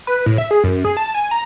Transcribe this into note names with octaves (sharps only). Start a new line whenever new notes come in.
B4
A2
E5
G#4
F#2
G#4
A5
G#5
A#5